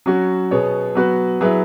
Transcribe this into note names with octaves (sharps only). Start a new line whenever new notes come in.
F#3 C#4 F#4
B2 B3 G#4 C#5
F#3 B3 F#4 B4
F#3 E4 G#4 B4